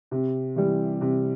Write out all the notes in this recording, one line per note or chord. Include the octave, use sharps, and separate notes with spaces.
C3
E3 G3
C3